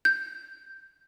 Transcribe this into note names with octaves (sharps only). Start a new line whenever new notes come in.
G6